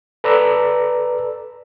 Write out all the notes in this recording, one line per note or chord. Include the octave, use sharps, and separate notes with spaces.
A4 B4 D5 A#5 E6